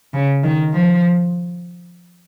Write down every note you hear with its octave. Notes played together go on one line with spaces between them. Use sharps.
C#3
D#3
F3